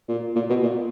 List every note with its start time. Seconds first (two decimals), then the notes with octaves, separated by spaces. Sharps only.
0.09 A#2
0.36 A#2
0.50 B2
0.63 A#2